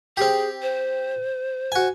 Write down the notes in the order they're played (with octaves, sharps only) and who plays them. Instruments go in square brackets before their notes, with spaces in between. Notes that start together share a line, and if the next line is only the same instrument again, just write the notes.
[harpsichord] C4 G4 [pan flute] G#4
[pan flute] C5
[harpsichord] F#4 G#5